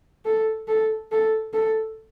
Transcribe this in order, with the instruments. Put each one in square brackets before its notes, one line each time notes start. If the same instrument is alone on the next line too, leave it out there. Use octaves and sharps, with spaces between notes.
[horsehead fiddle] A4
A4
A4
A4